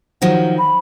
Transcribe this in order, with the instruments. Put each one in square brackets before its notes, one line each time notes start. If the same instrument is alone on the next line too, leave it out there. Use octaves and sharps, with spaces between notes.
[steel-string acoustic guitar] D#3 F3 F#3 [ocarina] F#5
[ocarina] B5